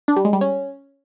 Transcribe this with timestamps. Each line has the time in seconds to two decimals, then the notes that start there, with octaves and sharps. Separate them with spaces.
0.08 D4
0.16 G3
0.25 G#3
0.33 G3
0.41 C#4